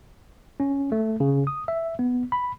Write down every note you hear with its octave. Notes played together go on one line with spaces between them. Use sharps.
C#4
A3
C#3
D#6
E5
B3
B5